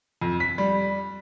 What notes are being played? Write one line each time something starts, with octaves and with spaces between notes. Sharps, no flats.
F2
B6
G3